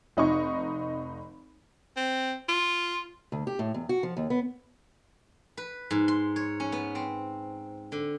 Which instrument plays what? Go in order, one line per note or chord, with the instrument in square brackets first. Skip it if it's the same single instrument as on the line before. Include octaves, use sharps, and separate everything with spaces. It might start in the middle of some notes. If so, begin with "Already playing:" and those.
[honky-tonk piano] F1 D#4 D#5 C#6
[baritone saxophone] C4
F4
[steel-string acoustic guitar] D2
G4
A2
E2
F#4
F3
D#2
B3
[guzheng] B4
G#2
C6
C#5
C#4
B3
C4
D3